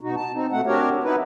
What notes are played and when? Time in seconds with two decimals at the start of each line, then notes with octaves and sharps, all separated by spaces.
0.01 B2 D#4 F#4
0.16 A5
0.34 C4 D#4
0.52 B2 A3 F#5
0.67 C4 D4 F#4 G4 A#4 C#5
1.04 B3 D#4 E4 B4